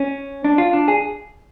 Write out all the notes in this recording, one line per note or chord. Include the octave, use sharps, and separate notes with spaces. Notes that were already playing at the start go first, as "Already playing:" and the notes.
Already playing: C#4
D4
F4
D4
G#4